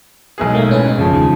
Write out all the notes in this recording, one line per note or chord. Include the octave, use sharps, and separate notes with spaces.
B1 G#3 G#4
A2 A3 A#3
A2 C#4 B4
F#2 C#3 F3
E2 D#3 G#3